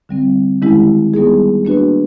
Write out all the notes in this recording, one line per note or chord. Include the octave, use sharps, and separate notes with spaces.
D3 G3 C4
D#3 G#3 C#4 E4 G4
G3 B3 D#4 G#4
A#3 D4 F#4 B4